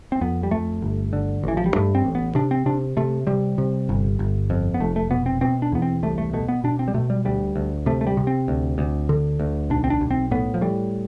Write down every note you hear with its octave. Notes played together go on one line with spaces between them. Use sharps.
C4
F2 B3
G3
F2 A3
G1
D3
A1 E3
F3
G3
G2 A3
C4
A1
B3
C3 D4
C4
C3 D4
C3 A3
C3 G3
C3
G1
G1
F2
B3
F1 A3
A3
B2 B3
C4
B2 C4
D4
E2 B3
C4
C2 A3
A3
B2 A3
B3
B2 D4
C4
G3
B2 A3
G3
D2 G3
D2
C3 A3
A3
G3
C3
C4
D2
D2
D3
D2
B1 D4
C4
D4
B1
C4
A2 B3
F3
A2 G3